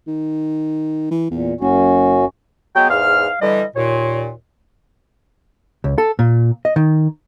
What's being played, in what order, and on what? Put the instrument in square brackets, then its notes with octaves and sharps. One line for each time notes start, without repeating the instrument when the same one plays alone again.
[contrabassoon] D#3
E3
[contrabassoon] E2 [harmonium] A#2
[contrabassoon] F#1 [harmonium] F#2 C#4 F#4
[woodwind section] F#3 G#3 B3 [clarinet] G5
[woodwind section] E2 G#2 F6 [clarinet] F5
[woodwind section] D3 E3 G3 [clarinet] D#5
[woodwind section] D#2 A#2 [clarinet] C#5
[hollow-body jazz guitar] C#2
A4
A#2
D#5
D#3